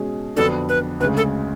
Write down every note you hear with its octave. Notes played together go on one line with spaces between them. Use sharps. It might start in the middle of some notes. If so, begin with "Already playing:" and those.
Already playing: B2 G#3 C#4 G#4
F2 D3 F#3 B3 D4 A4
B4
D2 C#3 G#3 B4
A4